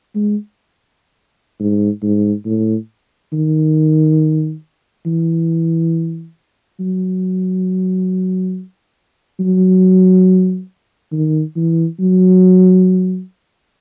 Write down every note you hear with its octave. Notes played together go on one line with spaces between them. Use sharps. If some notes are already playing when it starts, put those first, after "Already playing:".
G#3
G#2
G#2
A2
D#3
E3
F#3
F#3
D#3
E3
F#3